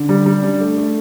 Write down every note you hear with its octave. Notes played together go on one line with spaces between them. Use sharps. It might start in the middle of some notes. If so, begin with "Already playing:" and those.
Already playing: D3
G3
G3
D4
A3
A3